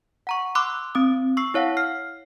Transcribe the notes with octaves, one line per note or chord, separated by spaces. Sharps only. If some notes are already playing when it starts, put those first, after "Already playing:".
F#5 A#5 C#6
B5 C6 D6 E6 F#6
C4 D#6
C#6 E6 C7
E4 C#5 F5 F#5
F6 C7